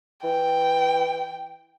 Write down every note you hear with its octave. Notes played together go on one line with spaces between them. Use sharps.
E3 G5